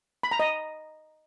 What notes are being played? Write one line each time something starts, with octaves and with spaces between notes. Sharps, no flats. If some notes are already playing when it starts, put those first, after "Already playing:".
B5
A#5
D#5